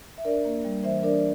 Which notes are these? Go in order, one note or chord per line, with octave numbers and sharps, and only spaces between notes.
E5
D4 A#4 D5
A#3
G3
E3 C5 E5
D4 A#4 D5
D5